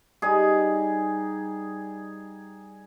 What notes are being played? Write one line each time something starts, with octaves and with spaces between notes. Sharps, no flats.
G3 D#4 G#4